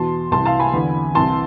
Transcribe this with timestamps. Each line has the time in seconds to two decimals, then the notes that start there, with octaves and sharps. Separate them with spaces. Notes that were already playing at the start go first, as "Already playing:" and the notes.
Already playing: E2 B2 A5 C6
0.32 C2 C3 E3 A5 C6
0.46 F5 A5
0.60 G#5 B5
0.73 E2 D3
1.14 C2 C3 E3 A5 C6